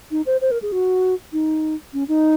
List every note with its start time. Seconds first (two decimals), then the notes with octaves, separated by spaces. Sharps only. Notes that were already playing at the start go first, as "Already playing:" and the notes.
0.11 D#4
0.26 C5
0.41 C5
0.51 A#4
0.62 G#4
0.72 F#4
1.33 D#4
1.93 C#4
2.08 D#4